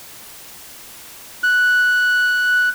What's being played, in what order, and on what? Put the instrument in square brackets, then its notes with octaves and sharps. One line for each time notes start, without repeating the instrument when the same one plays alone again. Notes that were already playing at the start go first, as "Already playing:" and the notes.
[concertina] F#6